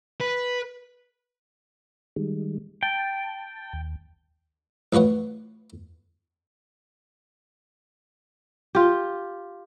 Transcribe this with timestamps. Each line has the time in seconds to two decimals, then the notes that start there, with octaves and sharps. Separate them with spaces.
0.21 B4
2.16 D#3 G3 G#3
2.83 G5 A5
3.73 D#2
4.93 A1 F3 B4 C#5 F#5
8.75 F4 G4